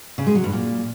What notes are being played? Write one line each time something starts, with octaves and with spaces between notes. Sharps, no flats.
C#3
G#3
F#3
G2
A#2